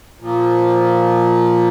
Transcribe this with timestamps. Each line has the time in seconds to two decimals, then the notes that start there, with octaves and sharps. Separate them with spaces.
0.21 A#2 F3 A#3